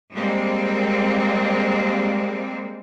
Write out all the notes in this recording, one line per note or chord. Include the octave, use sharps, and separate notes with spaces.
G3 G#3 A#3 C4